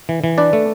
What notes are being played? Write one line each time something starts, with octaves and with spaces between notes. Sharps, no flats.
E3
E3
D4 B4 D5
A3